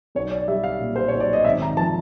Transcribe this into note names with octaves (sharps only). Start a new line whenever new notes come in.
B1 C#5
D5
G3 E5
F5
A#2
C5
C#5
B1
D5
D#5
G#1 E5
A#5
F3 A5